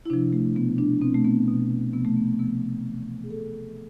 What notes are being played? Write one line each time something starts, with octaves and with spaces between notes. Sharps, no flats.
E4
C3 F3 D4
A3
B2 B3
D4
B2 C4
A3
B3
B2
C3 F3 B3
A3
B3
B3
C3 F3 B3
B3
C3 E3
G#4
B2 A4